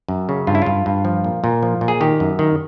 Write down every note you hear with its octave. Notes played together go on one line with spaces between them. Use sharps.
F#2
C#3
G2 F4
E4
G2 F4
G2
F3
A#2
A#2
F3
A#2
G#4
D#3 G4
F#2
D#3